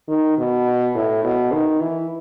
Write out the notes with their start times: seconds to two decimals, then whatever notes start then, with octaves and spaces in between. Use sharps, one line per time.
0.08 D#3
0.38 B2
0.95 A2
1.24 B2
1.52 D#3
1.81 E3